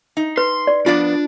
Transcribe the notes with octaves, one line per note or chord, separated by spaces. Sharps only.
D#4
B4 C6
D5
F3 B3 D4 F4 D5